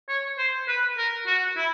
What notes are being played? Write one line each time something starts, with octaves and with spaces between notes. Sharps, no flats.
C#5
C5
B4
A#4
F#4
E4